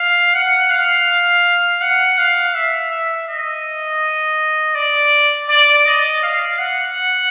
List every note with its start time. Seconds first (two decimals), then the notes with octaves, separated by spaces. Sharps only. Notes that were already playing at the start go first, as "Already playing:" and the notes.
Already playing: F5
0.34 F#5
0.70 F5
1.81 F#5
2.18 F5
2.55 E5
2.91 E5
3.28 D#5
4.75 D5
5.49 D5
5.86 D#5
6.23 F5
6.59 F#5